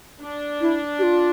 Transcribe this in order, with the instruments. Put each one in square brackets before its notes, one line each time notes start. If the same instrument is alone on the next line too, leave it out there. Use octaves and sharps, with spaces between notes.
[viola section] D4
[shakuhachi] E4
G4
F4